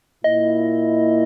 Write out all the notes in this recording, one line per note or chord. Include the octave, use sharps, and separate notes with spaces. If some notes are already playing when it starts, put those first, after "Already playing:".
A#2 A#3 E4 D#5